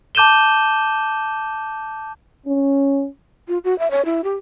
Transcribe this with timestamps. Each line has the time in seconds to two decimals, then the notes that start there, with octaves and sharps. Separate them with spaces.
0.15 A5 D6 G6 D#7 E7 G7
2.46 C#4
3.48 F4
3.64 F#4
3.79 E5
3.91 C#5
4.05 E4
4.24 G4